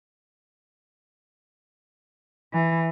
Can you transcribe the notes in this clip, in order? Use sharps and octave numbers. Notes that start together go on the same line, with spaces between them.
E3